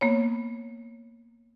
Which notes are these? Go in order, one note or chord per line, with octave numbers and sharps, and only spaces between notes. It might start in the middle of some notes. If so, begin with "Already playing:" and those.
A#3 B3 C#5